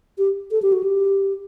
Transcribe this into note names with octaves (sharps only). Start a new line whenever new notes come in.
G4
A4
G4
F#4
G4